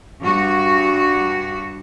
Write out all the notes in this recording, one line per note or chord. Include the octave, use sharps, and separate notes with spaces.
G2 F#4